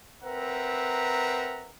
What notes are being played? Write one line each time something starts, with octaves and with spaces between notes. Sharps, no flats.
C4 A#4 B4 E5 F#5 A#5